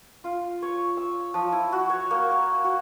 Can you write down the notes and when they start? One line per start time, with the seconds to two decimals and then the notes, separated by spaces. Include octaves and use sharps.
0.24 F4
0.62 C#5
0.97 E6
1.34 F3
1.52 E4
1.72 F#4
1.90 C#5
2.11 A#3
2.31 A#5
2.64 F#4